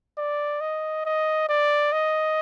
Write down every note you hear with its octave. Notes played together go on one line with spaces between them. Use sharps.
D5
D#5
D#5
D5
D#5